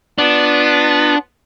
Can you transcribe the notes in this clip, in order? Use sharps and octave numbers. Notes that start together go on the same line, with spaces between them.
B3 D4 F4 B4